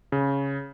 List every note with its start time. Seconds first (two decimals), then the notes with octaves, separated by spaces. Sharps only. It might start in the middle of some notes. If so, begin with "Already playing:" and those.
0.12 C#3